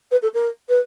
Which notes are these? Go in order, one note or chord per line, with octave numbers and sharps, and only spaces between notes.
B4
A4
A#4
B4